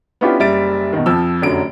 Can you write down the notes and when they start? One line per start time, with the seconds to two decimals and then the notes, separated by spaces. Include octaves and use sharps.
0.21 B3 C#4 D4 E4 F4 G4
0.39 F#1 G3 E5 A6 D7
0.93 B2 D#3
1.06 F2 F3 E6
1.42 F1 F#2 D3 F#3 D7